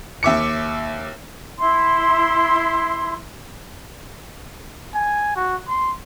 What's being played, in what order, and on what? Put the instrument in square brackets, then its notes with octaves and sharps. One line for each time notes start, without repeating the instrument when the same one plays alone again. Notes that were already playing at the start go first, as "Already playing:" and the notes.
[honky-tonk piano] D#2 E5 D6 C#7
[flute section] E4 C6
[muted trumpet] G#5
F#4
C6